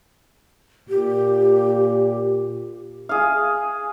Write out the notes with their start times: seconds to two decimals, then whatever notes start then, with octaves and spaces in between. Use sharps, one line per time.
0.89 A#2 G4
3.09 G#4 F5